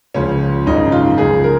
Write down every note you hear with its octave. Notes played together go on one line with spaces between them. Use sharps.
C#2 C#3 F3 C#4
G#1 F#2 C#3 F3 D#4
F4
C#2 C#3 F3 G#4
A#4